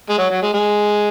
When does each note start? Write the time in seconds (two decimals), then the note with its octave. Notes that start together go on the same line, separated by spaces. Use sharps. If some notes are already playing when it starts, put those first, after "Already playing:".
0.10 G#3
0.18 F#3
0.30 F#3
0.42 G#3
0.54 G#3